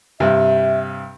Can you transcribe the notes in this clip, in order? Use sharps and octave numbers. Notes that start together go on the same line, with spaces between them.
G2 C3 E5